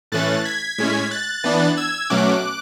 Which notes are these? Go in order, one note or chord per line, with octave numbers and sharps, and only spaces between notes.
A2 E3 A3 C#4 F#6 A6
G#6 B6
A2 G#3 C#4 G#6 B6
F#6 A6
E3 B3 D4
E6 G#6
B2 F#3 A3 C#4 D6 F#6